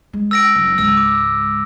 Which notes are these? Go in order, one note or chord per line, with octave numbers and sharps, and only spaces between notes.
G#3
E6 A#6 D7
F#1
C#2 G#2 E6
D6